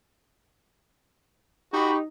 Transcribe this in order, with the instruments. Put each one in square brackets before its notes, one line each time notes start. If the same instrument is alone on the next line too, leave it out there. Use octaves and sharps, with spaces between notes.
[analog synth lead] D#4 [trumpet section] F#4 B5 [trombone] G4 [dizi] C#6